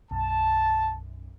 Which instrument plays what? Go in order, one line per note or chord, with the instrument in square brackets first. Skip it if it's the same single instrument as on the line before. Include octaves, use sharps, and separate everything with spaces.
[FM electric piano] B1 F#2 [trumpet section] A5